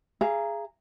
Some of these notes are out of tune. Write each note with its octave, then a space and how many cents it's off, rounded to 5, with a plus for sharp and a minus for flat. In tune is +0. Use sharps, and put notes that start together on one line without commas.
G#4 +0 F5 -35 A#5 +0